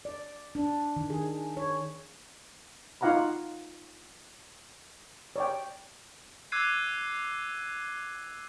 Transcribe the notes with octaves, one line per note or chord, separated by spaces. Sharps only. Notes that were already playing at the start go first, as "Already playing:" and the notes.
D5
D4
D#3
G#4
C#5
D#4 F4 F5 F#5 A#5 B5
C#5 D5 G5
D6 E6 F#6 G#6 C7 D#7